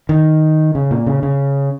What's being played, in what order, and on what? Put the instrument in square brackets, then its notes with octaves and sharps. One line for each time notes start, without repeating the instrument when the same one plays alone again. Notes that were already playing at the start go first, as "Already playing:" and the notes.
[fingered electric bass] D#3
C#3
A#2
C#3
C#3